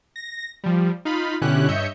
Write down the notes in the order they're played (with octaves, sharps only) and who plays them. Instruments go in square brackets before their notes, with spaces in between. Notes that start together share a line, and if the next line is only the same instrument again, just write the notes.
[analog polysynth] A#6
F3 G3
D#4 F4 F5 B5
B2 D3 C#4 E4 G4 F#6
G2 C#5 D#5 E5 G6 C#7